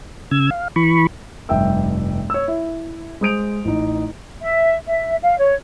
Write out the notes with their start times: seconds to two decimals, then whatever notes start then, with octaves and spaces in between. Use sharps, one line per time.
0.31 C#3 E6 G#6
0.51 F5
0.76 E3 B5 C#6
1.49 F1 G2 E5 G5 E6
2.30 C#5 E6
2.48 E4
3.21 G#3 C5 D#6 G6 D7 F7
3.65 A1 D#4
4.42 E5
4.86 E5
5.23 F5
5.38 C#5